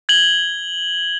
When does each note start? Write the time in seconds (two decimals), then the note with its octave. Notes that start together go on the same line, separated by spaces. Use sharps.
0.09 G#6 F#7 G7